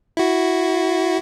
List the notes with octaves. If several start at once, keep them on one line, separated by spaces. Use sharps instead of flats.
E4 F#4